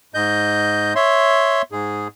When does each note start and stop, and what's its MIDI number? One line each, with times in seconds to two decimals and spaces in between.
0.14 0.93 44
0.14 0.93 75
0.14 0.93 91
0.95 1.62 73
0.95 1.62 76
0.95 1.62 84
1.72 2.08 44
1.72 2.08 68